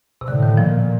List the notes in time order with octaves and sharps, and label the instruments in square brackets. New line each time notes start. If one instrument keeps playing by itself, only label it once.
[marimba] C3
[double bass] A2 [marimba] D3
[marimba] D#3
[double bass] A#2 [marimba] F3